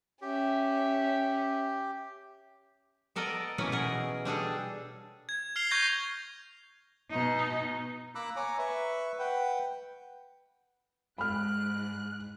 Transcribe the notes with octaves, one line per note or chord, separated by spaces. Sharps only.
C#4 G4 E5
B3 A4 A#4 D5 D#5 A#5
B2 E3 B3 C#4 A#4 B4
B2 G#4 A#4
G3 D4 G#4 A4
G#6
F6 G#6 C7 F7 G7
C#6 G6 G#6 A#6 F7
B2 D#4
A#3 A#5 B5 D6 E6 F#6
C#5 G#5 A#5 D6
B4 E5 C#6
B4 F#5 G5
G#2 B5 F6 F#6